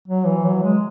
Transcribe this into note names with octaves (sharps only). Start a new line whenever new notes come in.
F#3
E3
F#3
G#3